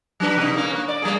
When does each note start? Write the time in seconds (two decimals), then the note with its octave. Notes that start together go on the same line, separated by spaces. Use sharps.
0.20 F#3 D4 B4
0.37 C3 D#4
0.56 A#3 C#4
0.73 A#3
0.88 D5
1.02 G3 A#3 G#4